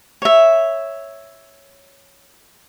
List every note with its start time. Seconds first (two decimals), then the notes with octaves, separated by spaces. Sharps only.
0.22 C#5 E5